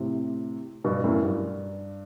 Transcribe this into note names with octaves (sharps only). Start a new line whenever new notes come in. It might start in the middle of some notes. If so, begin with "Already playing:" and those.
Already playing: A2 C3
G2 B2
F#2 A2
G2